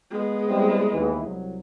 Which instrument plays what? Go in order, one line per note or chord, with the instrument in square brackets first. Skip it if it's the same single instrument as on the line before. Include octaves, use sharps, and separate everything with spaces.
[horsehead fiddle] G#3 B3
[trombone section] G3 C4 E4
D#2 E3
C2 F#3